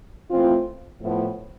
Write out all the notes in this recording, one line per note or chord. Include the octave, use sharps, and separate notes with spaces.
E3 A3 C4 F4
A2 F3 B3 E4